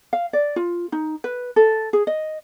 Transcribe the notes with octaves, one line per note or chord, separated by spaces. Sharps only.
F5
D5
F4
D#4
B4
A4
G#4
D#5